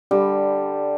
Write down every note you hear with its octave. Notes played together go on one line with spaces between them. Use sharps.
D3 G3